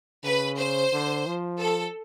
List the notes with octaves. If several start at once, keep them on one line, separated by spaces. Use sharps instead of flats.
C#3 B4
C5
D3
F3
A4